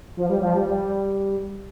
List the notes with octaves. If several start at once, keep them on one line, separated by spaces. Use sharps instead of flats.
F3
G3
F3
G3
G3